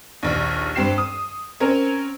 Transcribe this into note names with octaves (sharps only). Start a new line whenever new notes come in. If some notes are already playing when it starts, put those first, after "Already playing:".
A#1 D#2
G2 C4 G4 C7 E7
D#6
C4 C#4 A#4 C#5